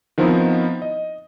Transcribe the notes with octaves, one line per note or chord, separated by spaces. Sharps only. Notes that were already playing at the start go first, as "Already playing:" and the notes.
D#3 F3 B3 C4 D#4 E4
D#5